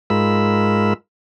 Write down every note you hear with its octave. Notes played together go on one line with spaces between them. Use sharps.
G#2 G#3 F4 A#4 B5 E6